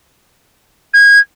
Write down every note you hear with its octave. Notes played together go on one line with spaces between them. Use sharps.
G#6